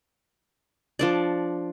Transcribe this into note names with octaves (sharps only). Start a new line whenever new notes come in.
F3 D4 D5